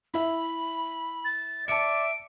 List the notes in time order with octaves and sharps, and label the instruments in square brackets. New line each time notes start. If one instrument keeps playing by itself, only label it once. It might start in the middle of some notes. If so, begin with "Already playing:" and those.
[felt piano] E4 E5 [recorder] B5
[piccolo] A6
[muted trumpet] D5 [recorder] E5 [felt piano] A5 C#7 [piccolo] D7